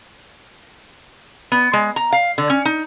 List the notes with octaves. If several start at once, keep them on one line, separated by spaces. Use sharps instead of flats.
B3
G#3
A#5
F5
D3
C#4
D#4